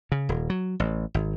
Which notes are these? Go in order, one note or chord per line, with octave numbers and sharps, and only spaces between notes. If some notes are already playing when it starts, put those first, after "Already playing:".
C#3
D#1
F#3
A1
G#1